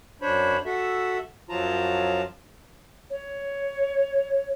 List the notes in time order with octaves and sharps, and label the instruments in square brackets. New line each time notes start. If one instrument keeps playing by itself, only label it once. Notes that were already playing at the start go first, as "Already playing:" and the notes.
[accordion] F#2 D4 C5 C#5 B5
F#4 A4 E5
F#2 F3 F#3 F4 A5 A#5
[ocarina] C#5